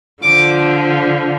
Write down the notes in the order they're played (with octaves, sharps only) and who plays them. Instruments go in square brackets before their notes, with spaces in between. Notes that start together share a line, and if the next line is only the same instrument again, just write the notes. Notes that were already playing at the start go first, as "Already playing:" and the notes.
[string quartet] D3 F3 D6